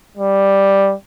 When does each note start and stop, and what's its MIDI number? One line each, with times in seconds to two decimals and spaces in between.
0.17 0.94 55